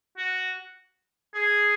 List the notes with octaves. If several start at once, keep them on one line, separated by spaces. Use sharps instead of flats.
F#4
G#4